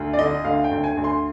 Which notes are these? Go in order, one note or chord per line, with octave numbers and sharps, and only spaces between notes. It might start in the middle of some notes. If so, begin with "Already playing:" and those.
Already playing: D2
D5
D3 D#5
D2 F5
G5
D2
G#5
D2
C6